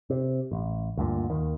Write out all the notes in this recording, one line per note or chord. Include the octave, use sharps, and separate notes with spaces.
C3
A1
D2 G2 A#2
D#2 D#3